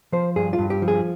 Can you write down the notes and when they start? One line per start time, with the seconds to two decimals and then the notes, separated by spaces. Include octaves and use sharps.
0.12 F3 C5
0.36 G2 G#4
0.53 F4
0.59 G2
0.70 G4
0.82 F3
0.88 G#4